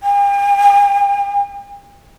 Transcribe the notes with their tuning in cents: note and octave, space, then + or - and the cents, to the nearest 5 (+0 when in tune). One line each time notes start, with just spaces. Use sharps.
G5 +45